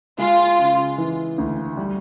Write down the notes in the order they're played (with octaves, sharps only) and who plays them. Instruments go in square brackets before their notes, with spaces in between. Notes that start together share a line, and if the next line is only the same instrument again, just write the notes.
[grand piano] G#3 [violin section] F4
[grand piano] C#3
E3
D2
G3